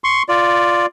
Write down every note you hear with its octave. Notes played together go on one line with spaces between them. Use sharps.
C6 C#6
F4 D5